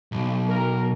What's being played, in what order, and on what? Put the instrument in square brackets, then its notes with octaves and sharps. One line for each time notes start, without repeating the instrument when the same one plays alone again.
[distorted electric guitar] B1
[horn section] A#4